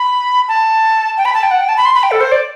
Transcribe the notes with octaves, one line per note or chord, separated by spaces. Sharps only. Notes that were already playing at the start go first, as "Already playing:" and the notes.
Already playing: B5
A5
G5
B5
A5
G5
F#5
G5
A5
B5
C6
B5
G5
A4
C5
D5